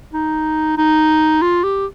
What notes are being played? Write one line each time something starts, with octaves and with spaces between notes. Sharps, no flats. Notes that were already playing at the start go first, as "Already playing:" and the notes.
D#4
D#4
F4
G4